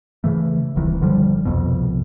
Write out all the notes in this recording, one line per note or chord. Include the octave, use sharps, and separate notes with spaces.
C#3 E3 A3
D#1 C2 D#3 E3
F#1 D3 F3 G3
C2 F2 B2